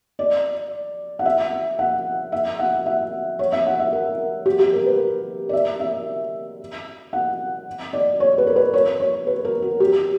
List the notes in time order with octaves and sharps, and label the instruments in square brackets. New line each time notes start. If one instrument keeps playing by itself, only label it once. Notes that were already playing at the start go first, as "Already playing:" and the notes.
[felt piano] D5
F#5
E5
F#5
E5
F#5
E5
C#5
E5
F#5
E5
A#4
G4
G4
A#4
B4
D5
E5
E5
F#5
D5
C#5
B4
A#4
B4
C#5
C#5
B4
A#4
F#4
G4